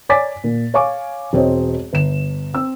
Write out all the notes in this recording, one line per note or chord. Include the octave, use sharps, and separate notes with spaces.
C#5 D5 G#5 D6 A6 B6
A#2
C#5 F5 G#5 C#6 D6
E1 C4 C5 C#5 D#5
G1 E7
C4 E6